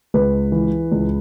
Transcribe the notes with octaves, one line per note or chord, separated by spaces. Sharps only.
C#2 B4
E3
C#2